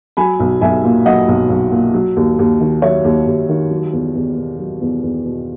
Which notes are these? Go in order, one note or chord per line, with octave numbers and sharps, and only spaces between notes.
F#3 G#5 B5
B1
B1 E5 G#5
A#2
F#3 D#5 F#5
B1
B1
A#2
F#3
D#2
D#2
D#3
F#3 C#5 E5
D#2
D#2
D#3
F#3
E2
E2
B2
F#3
E2
E2
B2